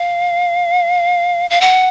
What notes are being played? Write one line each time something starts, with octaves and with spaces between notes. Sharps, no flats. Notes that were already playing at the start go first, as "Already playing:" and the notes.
Already playing: F5
F5
F#5